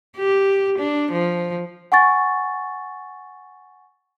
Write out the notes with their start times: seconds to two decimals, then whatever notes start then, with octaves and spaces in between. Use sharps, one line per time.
0.17 G4
0.78 D4
1.12 F3
1.92 F#5 G#5 C#6 A6